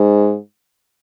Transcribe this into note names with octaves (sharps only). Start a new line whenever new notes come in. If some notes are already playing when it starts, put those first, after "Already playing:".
Already playing: G#2